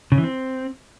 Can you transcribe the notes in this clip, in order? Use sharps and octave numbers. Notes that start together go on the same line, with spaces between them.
C#3
E3
C4